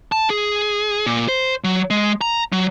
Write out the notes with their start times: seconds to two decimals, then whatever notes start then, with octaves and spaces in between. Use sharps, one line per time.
0.12 A5
0.30 G#4
1.06 A#2
1.28 C5
1.64 F#3
1.90 G#3
2.21 A#5
2.52 F#3